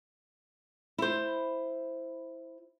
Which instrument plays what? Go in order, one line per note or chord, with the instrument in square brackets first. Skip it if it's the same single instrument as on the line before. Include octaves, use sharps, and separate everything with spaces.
[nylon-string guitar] E4 C5